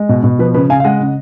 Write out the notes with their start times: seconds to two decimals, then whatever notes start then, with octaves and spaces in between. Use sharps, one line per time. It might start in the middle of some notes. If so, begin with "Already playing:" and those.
Already playing: G#3
0.09 B2
0.24 B2
0.39 F3 B4
0.54 C#3 B4
0.69 C#3 F5 G#5
0.80 F5
0.84 G#3 D#5 F#5
1.00 C#3